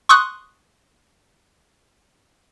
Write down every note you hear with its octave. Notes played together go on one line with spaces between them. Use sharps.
C6 C#6 D#6 F#6